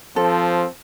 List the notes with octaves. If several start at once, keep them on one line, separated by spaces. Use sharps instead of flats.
F3 C4 A4